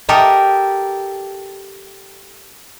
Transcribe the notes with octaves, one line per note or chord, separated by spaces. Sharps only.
G4 A4 A#4 D#5